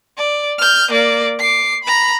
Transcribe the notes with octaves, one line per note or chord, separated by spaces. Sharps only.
D5
F6 G6
A#3 D5
D6 C7
A#5 B5